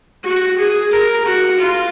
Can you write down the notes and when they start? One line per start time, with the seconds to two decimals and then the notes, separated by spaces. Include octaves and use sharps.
0.24 F#4
0.59 G#4
0.92 A#4
1.25 F#4
1.59 F4